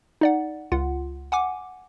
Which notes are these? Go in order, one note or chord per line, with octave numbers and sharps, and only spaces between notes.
D#4 D5 F#5
C#2 F4 F#5
F#5 G#5 D6